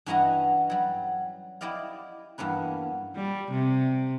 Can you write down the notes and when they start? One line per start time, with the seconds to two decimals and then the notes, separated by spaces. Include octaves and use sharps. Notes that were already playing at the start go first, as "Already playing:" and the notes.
0.06 G2 E3 C#4 F#4 D#5 A#5
0.70 F#3 G3
1.61 E4 G4 D5 D#5 F5
2.38 E2 G2 A#3 C#4 B4
3.15 G3
3.51 C3